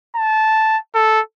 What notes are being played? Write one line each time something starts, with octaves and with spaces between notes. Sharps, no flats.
A5
A4